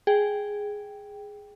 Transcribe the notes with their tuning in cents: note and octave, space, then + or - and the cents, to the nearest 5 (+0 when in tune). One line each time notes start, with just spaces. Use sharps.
G#4 +0 G5 +0